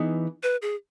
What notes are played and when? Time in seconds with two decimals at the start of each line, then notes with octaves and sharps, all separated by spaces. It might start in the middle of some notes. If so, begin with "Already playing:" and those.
Already playing: E3 B3 D#4 G#4
0.43 B4
0.62 G#4